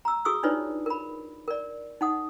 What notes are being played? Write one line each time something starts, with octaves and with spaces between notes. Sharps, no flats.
A#5 E6
F#4 G#4 C#6 D#6 E6
D4 D#4 F4 B4 C#5 D5
A#4 B5
A#4 D5
D#4 F#5 D#6